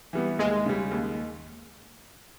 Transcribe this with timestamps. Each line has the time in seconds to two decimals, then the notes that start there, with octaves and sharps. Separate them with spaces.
0.13 E3 G3 B3
0.39 D#2 G#3
0.66 C#3 G3
0.91 D#2